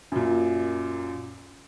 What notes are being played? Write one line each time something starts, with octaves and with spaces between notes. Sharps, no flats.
F#2 A#2